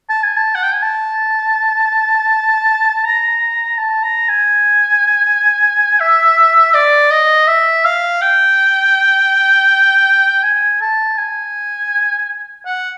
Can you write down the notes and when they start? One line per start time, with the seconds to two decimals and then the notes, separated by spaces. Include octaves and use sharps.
0.09 A5
0.23 G#5
0.37 A5
0.55 F#5
0.63 G5
0.74 G#5
0.82 A5
3.04 A#5
3.78 A5
4.03 A#5
4.28 G#5
6.00 E5
6.74 D5
7.11 D#5
7.47 E5
7.85 F5
8.21 G5
10.43 G#5
10.81 A5
11.18 G#5
12.66 F#5